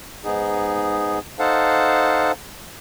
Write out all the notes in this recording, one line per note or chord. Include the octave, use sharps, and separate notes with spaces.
G#2 B3 D#4 G#4
D#4 A4 C5 F5 F#5 A5